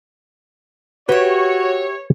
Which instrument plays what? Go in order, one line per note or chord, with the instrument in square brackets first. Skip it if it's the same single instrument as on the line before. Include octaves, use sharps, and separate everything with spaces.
[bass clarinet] F#4 [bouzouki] G4 E5 [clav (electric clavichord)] B4 [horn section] C#5